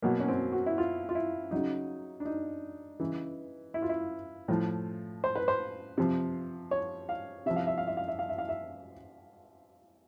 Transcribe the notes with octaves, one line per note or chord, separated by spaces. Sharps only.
B2 F#3 A#3
C#4
C4
F#4
E4
F4
F4
E4
C#3 F#3 D#4
D4
D#4
C#3 E3
E4
F4
E4
A2 F3
C5
B4
C5
C3 F3
C#5
F5
C3 F3 E5
F5
E5
F5
E5
F5
E5
F5
E5
F5
E5